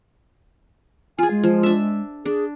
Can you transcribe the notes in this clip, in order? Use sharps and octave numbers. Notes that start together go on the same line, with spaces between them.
F4 G#4 G#5
G#3
F3
D4 E5
D4 G#4